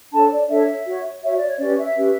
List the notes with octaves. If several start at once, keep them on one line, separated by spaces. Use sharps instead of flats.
D4 A4 C#5 A5
D5
D4 A4 C#5 E5
F#4 C#5
F#4 C#5 E5
D5
C#5
C#4 G4 B4 D5
E5
C#4 G4 B4